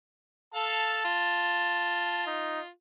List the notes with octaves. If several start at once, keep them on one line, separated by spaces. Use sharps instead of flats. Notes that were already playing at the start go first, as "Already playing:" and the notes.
A4 F5 A5
F4
D#4